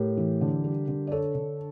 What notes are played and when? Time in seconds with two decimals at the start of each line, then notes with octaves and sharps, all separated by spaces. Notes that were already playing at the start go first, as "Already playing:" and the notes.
Already playing: A2 G4 A#4
0.17 E3
0.41 D3
0.64 G3
0.88 D3
1.07 D5
1.11 D4 A4 C#5
1.35 D3